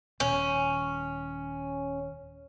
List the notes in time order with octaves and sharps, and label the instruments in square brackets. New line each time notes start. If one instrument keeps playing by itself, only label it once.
[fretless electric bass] D#1 [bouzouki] C#4